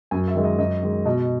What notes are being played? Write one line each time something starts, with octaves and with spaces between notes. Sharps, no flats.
F#2 G#5
E5
D#3 G#3
D#5
F#2 D#5
D#3 G#3
B2 D#5